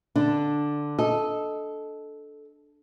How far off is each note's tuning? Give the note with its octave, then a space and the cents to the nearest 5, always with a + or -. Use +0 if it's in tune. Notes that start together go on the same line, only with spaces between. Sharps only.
D3 +0 D4 +5
A4 -10 D#5 +0